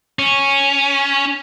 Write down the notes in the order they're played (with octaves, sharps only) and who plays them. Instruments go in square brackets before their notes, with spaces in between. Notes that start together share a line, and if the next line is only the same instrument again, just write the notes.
[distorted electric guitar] C#4